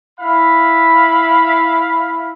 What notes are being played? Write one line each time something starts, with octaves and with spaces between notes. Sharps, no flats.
E4 F5 B5